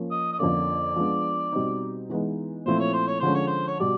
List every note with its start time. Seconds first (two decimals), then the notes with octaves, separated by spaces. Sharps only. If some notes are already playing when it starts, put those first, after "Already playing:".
Already playing: F3 A#3 C#4
0.11 D#5
0.33 D#5
0.39 F2 D3 F3 A#3 C#4 D5
0.96 F3 G#3 B3 D4
1.52 B2 G3 C4 D#4
2.10 E3 G#3 B3 D#4
2.65 A#2 F3 A3 C4 E4 C5
2.80 C#5
2.93 C5
3.07 C#5
3.20 D3 F3 G#3 C#4 C5
3.34 C#5
3.47 C5
3.67 C#5
3.80 B2 G3 D5